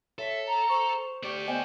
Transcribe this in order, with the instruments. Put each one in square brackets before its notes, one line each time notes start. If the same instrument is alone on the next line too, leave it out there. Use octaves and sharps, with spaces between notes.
[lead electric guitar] A4 [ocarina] C#5 [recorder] E5
[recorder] A#5
[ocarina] C5 [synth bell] C#6 E7 F7
[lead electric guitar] A3 D5 [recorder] G4
[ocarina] B3 [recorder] C5 [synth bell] D#5 G5 G#5